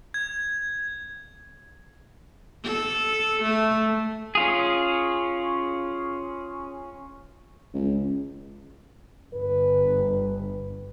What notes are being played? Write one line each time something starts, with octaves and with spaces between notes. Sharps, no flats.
G#6
A4
A3
C#4 F4 G#4
C#2
G1 B4